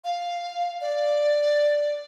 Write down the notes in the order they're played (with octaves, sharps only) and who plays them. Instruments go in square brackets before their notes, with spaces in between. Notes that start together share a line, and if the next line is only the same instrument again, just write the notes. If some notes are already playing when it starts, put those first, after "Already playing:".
[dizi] F5
D5